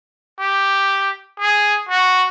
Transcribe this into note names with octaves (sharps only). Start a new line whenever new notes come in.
G4
G#4
F#4